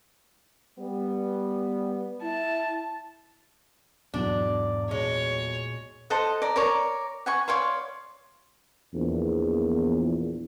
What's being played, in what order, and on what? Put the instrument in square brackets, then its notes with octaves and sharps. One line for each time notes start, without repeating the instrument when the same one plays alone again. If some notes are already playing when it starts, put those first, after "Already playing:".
[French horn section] G3 B3
[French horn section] E4 [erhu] A5
[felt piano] B1 E2 [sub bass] G#2 [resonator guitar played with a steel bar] D4
[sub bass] A#2 [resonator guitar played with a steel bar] G#3 [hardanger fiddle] C#5
[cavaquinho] A4 C5 D#5 F#5
D5 A#5
A#4 C#5 D5
F#5 G#5 C#6
C#5 D5 F5 C6
[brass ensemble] A#1 E2